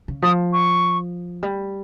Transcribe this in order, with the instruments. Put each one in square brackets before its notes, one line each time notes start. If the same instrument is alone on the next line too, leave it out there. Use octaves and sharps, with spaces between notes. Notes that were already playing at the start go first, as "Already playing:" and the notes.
[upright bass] C#3
[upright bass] F3 [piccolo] D#6
[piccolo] C#6
[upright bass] G3